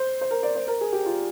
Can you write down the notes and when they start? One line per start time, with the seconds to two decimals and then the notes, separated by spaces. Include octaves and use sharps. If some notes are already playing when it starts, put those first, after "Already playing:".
Already playing: C5
0.21 C5
0.31 A#4
0.43 D5
0.56 C5
0.68 A#4
0.81 G#4
0.93 G4
1.06 F4